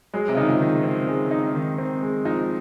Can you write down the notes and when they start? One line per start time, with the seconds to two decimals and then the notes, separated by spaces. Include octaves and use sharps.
0.14 F#3 G#3
0.28 C3
0.34 C#3
0.37 D#3 D#4
0.48 F3
0.61 D#3
0.84 C4
1.08 G#3
1.31 D#4
1.55 D#3
1.78 C4
2.02 G#3
2.25 F3 D#4